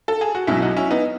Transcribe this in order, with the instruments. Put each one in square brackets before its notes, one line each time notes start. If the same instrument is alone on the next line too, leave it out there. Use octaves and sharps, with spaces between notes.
[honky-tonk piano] A4
G#4
F#4
B1 B2 F#3 C#4 E4
D#4 F#4
C#4 E4
B3 D#4